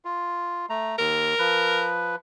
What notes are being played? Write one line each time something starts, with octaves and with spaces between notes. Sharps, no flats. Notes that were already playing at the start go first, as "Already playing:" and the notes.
F4
A3 A#5
D#2 A#4
F3 B4